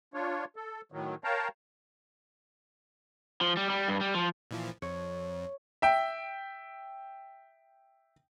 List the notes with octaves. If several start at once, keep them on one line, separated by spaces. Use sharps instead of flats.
D4 F4 C#5
A4
A2 D#3 F#3
A#4 C#5 F5 G5 A5 A#5
F3
G3
G3
G2
G3
F3
A#2 E3 F3
F2 C#5
E5 G5